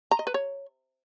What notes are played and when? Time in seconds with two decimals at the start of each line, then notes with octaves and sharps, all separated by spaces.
0.11 A#5
0.19 D#5
0.27 B4
0.34 C#5